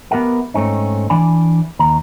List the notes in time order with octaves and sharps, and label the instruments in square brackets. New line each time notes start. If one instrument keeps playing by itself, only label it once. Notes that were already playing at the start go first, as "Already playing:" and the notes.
[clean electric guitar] B3 G4 A#4 E5 F#5
G#2 A3 C4 C#4 D#4
E3 D4 D5 G#5 B5
D#2 A#5